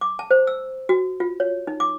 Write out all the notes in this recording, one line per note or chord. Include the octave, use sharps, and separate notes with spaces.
D6
A5
C5
E6
F#4
F4
C#5
D#4
D6